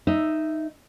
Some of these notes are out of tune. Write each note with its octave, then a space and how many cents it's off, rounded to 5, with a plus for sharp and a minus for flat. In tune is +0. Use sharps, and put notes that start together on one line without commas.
D#4 +0 E5 +0